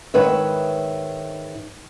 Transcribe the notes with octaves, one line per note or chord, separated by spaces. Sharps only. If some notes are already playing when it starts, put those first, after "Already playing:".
G#2 D#3 B4 C#5 E5